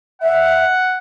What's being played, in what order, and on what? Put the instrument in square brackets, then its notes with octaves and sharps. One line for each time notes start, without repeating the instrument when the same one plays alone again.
[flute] E5 [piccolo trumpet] F#5